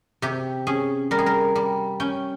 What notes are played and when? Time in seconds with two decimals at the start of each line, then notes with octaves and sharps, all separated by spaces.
0.22 C3 G4
0.67 C#4 G#4
1.11 G3 A#4
1.19 G#4
1.26 A#4
1.56 G3
2.00 C#4 G5